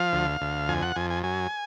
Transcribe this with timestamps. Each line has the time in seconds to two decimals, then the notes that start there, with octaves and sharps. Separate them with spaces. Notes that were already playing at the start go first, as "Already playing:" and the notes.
Already playing: F3 F5
0.13 D2
0.41 D2
0.68 F2 G#5
0.82 F#5
0.96 F2 G#5
1.10 G#5
1.23 F#2 G#5